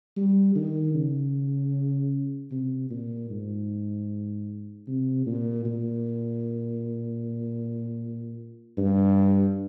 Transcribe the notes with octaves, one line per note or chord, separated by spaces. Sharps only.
G3
D#3
C#3
C3
A#2
G#2
C3
A#2
A#2
G2